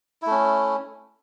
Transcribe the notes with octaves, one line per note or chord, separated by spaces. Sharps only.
A3 C#4 E4